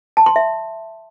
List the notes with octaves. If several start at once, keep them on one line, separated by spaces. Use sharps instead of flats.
A5
C6
E5